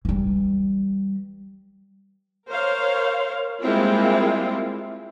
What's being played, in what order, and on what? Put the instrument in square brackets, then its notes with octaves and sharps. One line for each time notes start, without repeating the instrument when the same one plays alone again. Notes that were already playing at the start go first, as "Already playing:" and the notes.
[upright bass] E3 G3
[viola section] A#4 C5 C#5 F5
G3 G#3 A#3 C4 E4 F4